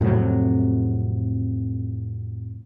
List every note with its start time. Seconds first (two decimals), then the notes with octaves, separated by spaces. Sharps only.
0.01 F2 A2 C3 F#3